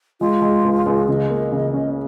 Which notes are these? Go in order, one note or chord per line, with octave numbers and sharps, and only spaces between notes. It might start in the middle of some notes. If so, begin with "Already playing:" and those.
G#3 F4
G#3
C#2
C#2
C#3 D#5
A#3
C#3
C#4